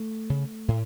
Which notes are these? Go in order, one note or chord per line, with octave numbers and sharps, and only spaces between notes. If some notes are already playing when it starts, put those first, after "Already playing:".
Already playing: A3
C#3
A2